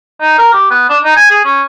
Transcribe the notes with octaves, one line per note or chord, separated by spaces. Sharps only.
D#4
A#4
G4
B3
D4
D#4
G#5
G#4
C#4